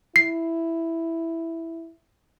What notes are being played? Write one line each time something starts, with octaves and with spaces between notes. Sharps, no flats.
E4 C7